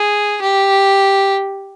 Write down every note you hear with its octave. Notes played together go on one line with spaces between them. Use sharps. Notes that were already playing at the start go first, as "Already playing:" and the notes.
Already playing: G#4
G4